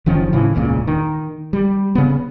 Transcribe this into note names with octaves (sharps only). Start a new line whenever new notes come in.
F#1 D#3 F3 C#4
A2 C#3 E3
E1 C#2 A#2 C#3
D#3
G3
C#3 B3